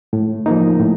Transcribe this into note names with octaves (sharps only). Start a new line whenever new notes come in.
A2
F3 A#3 D#4
A2